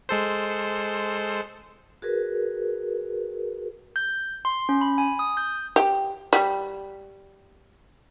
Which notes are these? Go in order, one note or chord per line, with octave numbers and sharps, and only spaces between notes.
G#3 A4 C5
F#4 G#4 A#4 B4
G6
C6
C#4
B5
G#5
D#6
G6
G4
G3